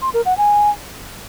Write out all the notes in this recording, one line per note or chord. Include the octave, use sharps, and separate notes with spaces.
C6
A#4
F#5
G#5